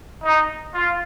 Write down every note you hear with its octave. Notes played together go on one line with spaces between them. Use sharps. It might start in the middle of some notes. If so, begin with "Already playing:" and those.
D#4
F4